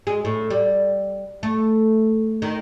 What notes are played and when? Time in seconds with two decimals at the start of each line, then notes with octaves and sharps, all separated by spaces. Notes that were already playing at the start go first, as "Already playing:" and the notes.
0.07 G#3
0.25 A2
0.50 G3
1.43 A3
2.42 D#3